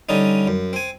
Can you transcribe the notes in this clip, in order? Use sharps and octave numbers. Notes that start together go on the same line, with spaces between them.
D3 G3 C#4 D#4
F#2
C4 G#5